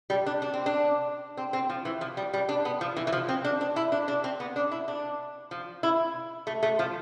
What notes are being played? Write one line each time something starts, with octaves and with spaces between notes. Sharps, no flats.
G3
D4
D4
C4
D4
C4
C4
F3
E3
F3
G3
G3
D4
B3
F3
E3
E3
F3
C4
D4
D4
E4
D4
D4
C4
B3
D4
E4
D4
F3
E4
A3
A3
F3